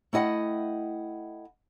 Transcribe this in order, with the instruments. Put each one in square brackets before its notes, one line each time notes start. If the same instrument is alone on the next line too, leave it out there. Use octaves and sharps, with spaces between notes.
[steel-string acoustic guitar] A3 E4 D#5 F#5 G5